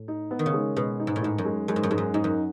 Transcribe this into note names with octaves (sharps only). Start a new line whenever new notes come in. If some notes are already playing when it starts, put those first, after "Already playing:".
Already playing: A2
D#4
B3
D#3
C#3
G#3
B2 G#3
D#4
G#2
A2
G#2 D#4
F#2
G#3
F#2 G#3
G#2
F#2
G#2 G#3
F#2
G#2 D#4
F#2